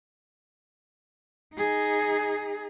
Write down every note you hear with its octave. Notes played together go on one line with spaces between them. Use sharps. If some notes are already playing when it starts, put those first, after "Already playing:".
D#4 G#4